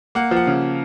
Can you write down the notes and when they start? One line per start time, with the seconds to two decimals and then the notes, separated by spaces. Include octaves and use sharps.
0.15 A#3 F#5
0.31 F3
0.36 F#5
0.47 C#3